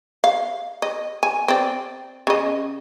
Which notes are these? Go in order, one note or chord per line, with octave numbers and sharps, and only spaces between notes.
F5
D#5
G#5
C4 D5
C#3 D#5